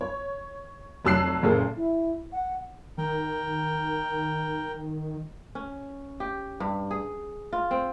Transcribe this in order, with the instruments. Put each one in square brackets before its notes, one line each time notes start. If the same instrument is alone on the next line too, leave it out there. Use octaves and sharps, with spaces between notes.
[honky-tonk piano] C#5
F1 F#3 A5 E6 F#6 C7
F#1 A#2 G#4 A4
[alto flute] E4
F#5
[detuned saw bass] D#3 [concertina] A#4 G5
[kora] C#4
G4
G2
G#4
F4
C4